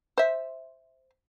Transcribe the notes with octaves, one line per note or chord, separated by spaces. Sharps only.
C5 E5